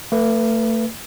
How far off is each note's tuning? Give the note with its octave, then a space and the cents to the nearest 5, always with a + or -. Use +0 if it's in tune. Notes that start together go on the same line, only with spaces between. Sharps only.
A3 +35 B4 +0